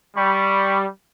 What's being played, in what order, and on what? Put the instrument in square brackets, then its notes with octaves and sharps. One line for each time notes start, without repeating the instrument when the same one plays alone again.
[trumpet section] G3 [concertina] B5 C#6